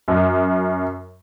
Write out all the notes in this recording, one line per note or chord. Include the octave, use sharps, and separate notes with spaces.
F#2